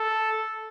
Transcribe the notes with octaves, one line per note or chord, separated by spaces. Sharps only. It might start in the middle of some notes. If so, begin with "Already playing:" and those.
Already playing: A4